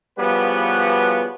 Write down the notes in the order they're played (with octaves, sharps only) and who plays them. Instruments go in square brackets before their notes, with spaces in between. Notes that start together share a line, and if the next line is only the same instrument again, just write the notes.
[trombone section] C#3 F3 G3 B3 F#4 B4